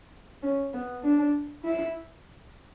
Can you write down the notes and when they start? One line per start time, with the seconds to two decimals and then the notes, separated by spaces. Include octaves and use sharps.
0.43 C#4
0.73 B3
1.04 D4
1.64 E4